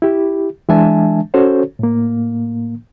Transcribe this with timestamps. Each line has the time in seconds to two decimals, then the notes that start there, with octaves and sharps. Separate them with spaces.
0.02 E4 G4
0.69 E3 G#3 D4 E5 G#5 A5
1.34 C#4 F#4 A4 C5 C#5
1.79 A2 A#3